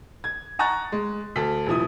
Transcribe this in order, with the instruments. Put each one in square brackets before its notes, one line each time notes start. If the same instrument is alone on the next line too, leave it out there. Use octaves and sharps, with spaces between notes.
[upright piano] G#6
F#5 A#5 C#6 F#6 A6
G#3
D2 A4 B6
D#1 C3 F3 E4 D#6